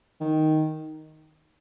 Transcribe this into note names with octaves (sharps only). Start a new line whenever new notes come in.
D#3